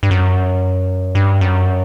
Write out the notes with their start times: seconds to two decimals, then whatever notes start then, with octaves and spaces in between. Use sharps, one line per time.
0.03 G2
0.11 F#2
1.15 G2
1.41 F#2